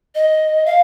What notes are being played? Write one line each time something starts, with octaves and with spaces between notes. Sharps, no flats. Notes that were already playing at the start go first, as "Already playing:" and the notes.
D#5
F5